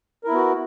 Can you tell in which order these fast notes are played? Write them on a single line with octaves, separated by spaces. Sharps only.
A#4 E4 B3 F#4